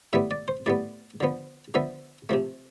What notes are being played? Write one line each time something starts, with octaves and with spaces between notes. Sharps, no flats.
A2 G3 B3 E5
D5
C5
A2 G3 B3 D5
D3 F3 B3
D3 F3 B3 E5
C3 F3 A3